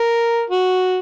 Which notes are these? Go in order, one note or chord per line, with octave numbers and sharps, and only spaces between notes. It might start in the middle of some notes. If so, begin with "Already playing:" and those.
Already playing: A#4
F#4